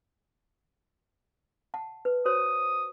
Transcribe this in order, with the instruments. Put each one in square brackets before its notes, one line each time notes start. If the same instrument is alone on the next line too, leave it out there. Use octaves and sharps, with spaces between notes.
[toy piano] F#5 A5
B4
[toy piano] F#4 C5 C#5 [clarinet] D#6